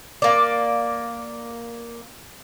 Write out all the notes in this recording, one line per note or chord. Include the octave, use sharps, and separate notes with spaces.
A#3 D5